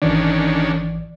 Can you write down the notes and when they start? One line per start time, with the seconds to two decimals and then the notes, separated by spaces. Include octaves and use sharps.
0.02 G#1 D#3 E3 C#4 D4 D5